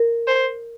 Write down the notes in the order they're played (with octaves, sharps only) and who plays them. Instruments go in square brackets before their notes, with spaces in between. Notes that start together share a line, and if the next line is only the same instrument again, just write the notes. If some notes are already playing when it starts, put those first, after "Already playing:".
Already playing: [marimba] A#4
[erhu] C5